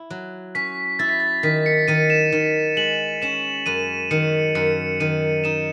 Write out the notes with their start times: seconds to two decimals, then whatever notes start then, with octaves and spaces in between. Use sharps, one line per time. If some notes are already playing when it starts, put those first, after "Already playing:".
Already playing: E4
0.10 F#3
0.55 C#4 B6
0.99 E4 A6
1.09 B6
1.20 A6
1.43 D#3 B6
1.66 C#7
1.88 D#3 D#7
2.10 E7
2.32 D#3
2.77 G#3 F#7
3.22 C#4 E7
3.66 F#2 D#7
4.11 D#3 C#7
4.55 F#2 C#7
5.00 D#3 D#7
5.44 D#4 E7